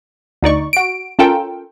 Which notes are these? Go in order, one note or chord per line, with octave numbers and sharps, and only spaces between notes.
D2 D#4 D5 C#6
F#4 D7
C#4 F4 A4 A#4 G5